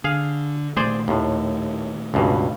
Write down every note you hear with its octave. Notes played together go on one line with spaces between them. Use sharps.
D3 G#4 F5
A#2 D#3 A3 G#4 C5 D5
D#2 A2
C#2 G2 B2